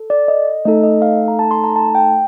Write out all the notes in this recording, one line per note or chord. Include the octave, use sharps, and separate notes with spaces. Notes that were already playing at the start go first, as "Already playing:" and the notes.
Already playing: A4
D5
D#5
A3 D#4 A4 D#5
D#5
F5
A#5
A5
C6
A#5
A5
G5